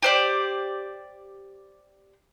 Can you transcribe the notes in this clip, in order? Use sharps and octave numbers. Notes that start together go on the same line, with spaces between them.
G4 C5 D5